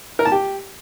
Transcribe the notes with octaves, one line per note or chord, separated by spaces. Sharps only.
A#4
A5
G4